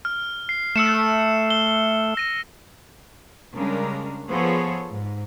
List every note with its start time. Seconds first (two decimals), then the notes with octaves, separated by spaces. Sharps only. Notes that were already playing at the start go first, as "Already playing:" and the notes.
0.05 F6
0.49 C7
0.76 A3 E6 C#7 E7
1.50 G7
2.17 A#6 D#7
3.55 C#3 G3 G#3 D4 A#4
4.28 F3 B3 G#4 A4 C5 C#5
4.90 G#2